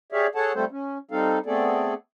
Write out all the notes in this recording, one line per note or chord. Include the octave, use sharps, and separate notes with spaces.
G4 G#4 C#5 D5 E5 F5
G#4 A4 C#5 F#5 A5
G3 A3 C4 F4 A4 C5
C#4
G3 C4 D#4 A4 F5
A3 B3 C4 G#4 A4 D5